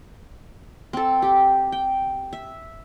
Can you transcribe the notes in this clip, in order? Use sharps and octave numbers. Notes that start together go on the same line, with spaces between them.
C4 A4
G4
G5
E5